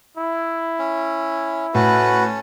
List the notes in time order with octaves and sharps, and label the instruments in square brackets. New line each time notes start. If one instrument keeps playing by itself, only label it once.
[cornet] E4
[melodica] C#4
[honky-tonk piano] A2 [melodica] C#4 A4 [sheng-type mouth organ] F#4 B4